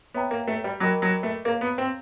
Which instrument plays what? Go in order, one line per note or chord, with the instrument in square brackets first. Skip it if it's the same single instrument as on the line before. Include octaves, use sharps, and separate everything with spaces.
[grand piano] B3 [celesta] C#5 E5 G5 A#5
[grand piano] A#3
A3
G3
[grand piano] F#3 [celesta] A#4 D#5 G5 B5 D6
[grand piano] F#3
A3
[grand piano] A#3 [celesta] G#4 C#5 F5 A#5
[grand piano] B3
C4